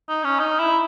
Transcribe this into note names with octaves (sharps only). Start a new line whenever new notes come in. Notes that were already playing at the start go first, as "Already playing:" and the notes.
D#4
C#4
D#4
E4